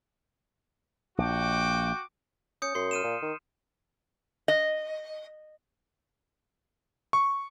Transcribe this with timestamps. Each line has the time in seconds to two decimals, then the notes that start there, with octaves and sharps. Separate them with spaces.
1.18 A#1 F#4 G5 D6
2.62 C#4 D#6 G6 C#7
2.75 F#2 C6 C7 C#7
2.91 F6 D#7 E7
3.04 A#2
3.22 D#3
4.48 D#5
7.13 C#6